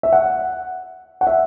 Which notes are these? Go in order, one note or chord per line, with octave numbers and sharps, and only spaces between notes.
E5
F#5
F#5
E5